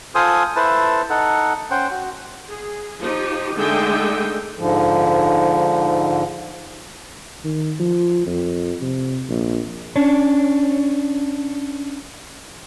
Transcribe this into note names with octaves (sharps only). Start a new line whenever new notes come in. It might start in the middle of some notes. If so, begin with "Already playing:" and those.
F4 A4 C5 G#5 D#6
E4 A4 B4 C5 A5
D#4 A4 F#5
C#4 C5 F#5 G5
F#4
G#4
F3 D#4 G4
D3 G#3 A3 D#4 E5 G5
G#2 D3 F3
D#3
F3
F2
C3
A#1
C#4 D4